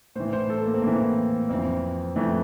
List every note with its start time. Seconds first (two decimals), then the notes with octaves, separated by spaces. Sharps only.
0.15 A2 C5
0.20 E3
0.33 C5
0.50 A4
0.66 A#3
0.74 C4
0.82 A2 E3 A#3
1.49 F2 E3 C4
2.16 F2 E3 A3